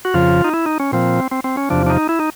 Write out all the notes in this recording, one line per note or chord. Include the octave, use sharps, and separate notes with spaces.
F#4
F2 C#3 F3 F4
D#4
E4
D#4
C#4
A#2 F3 C4
C4
C4
C#4
E2 C3 F3 D4
D4
D#4
E4
D#4